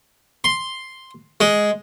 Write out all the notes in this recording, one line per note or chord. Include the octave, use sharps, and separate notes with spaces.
C6
G#3